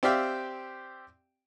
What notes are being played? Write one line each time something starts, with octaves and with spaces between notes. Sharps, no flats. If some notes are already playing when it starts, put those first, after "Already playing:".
C4 G4 D5 E5 F5 G5